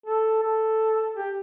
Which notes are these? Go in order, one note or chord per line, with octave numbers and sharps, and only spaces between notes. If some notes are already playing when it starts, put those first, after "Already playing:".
A4
A4
G4